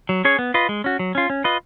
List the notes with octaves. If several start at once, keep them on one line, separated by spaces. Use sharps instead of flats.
F#3
C#4 G#4 C#5
B3
F4 B4 D#5
G#3
C#4 F#4
F#3
C#4 F4
C#4
F4 B4 D#5